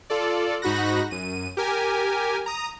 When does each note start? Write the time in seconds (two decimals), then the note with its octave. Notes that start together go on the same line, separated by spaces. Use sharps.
0.10 F4 A4 D5
0.62 G#2 D#4 F#4 B5 F#6 A#6
1.11 F#2 D#7
1.57 G4 A#4 G#5
2.46 A#5 D#6